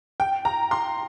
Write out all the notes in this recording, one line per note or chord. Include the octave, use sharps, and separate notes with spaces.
G5
A#5
C6